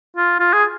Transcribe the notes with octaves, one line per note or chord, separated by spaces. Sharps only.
F4
F4
G#4